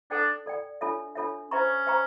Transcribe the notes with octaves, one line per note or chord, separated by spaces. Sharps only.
D4 A4 D5 G5
A4 D5 G5
D4 F4 A4 C#5 E5
D4 F4 A4 C#5 E5
C#4 C5 E5 G5 A#5 C#6
C5 E5 G5 A#5 C#6